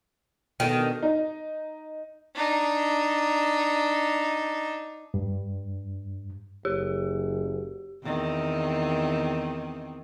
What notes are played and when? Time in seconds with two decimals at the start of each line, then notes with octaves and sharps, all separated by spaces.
0.60 B2 D#3 A4
0.77 D4 A4
1.02 D#4
2.35 D4 D#4
5.14 G2
6.65 F#1 G4
8.03 E2 D#3 C4